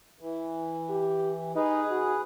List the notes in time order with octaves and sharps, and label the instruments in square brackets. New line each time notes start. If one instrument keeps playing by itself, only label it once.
[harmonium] E3
[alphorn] G4
[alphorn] D#4 [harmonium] G#4 B4
[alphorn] F#4